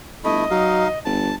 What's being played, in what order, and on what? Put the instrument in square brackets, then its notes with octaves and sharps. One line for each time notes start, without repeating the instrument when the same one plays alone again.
[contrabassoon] G1 [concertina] A3 E4 [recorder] D#5
[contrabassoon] F#3 [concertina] D#4 F5
[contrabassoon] G1 [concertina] A5